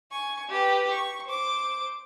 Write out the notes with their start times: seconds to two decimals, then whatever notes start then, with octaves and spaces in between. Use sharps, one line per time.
0.11 G#5 C#6
0.49 G4 B4
0.90 C#6
1.25 C5 D6